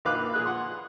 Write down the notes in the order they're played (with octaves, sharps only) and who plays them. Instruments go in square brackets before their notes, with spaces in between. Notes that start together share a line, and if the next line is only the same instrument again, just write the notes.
[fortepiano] A#1 D#3 B4 F5 D6 F#6
A#2 G#4 F#6
F#5 C6